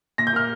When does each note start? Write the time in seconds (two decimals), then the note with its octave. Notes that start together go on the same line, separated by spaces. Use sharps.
0.18 A#2 A#6
0.27 G6
0.33 A#3 F6